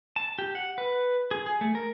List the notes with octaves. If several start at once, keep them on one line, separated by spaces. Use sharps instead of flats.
A5
G4
F#5
B4
G#4
G#4
A3
A#4